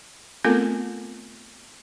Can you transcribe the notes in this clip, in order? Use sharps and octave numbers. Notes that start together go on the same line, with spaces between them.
A3 B3 C4 F4 A4 A#4